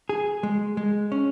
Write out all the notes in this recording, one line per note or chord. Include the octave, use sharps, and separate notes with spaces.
G#4
G#3
G#3
C#4